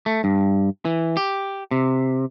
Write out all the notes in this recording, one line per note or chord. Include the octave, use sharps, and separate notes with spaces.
A3
G2
E3
G4
C3